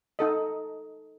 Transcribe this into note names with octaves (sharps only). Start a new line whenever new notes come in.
D#4 A4 D#5